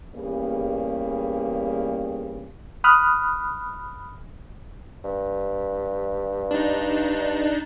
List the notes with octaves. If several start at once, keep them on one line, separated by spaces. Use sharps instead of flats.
E2 G2 C#3 G3 A#3
B5 D#6 F6 F#6
G2
D4 D#4